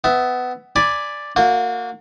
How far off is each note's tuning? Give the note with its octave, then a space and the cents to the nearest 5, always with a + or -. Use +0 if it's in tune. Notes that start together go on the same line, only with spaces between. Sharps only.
B3 +20 E5 +0
D5 +0 G#5 +0 B5 +0
A#3 -25 F#4 -40